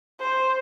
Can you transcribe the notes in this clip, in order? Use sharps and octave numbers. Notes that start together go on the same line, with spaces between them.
C5